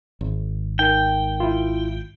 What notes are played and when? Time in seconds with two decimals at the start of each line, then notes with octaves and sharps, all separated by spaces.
0.21 G#1
0.79 D#4 A#4 G5
1.40 E4 F4